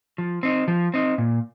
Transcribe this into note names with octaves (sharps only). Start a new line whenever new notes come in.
F3
C4 D#4
F3
C4 D#4
A#2